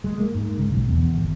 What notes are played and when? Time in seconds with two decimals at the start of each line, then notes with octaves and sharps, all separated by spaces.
0.04 G#3
0.19 A#3
0.34 G#2
0.58 C#2
0.72 B1
0.88 E2
1.16 G#1